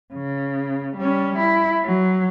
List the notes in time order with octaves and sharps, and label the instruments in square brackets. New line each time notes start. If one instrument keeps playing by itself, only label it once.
[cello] C#3
G3 C#4
E4
F#3